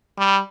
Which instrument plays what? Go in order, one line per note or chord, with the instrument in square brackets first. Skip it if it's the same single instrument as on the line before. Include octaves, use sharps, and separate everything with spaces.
[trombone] G3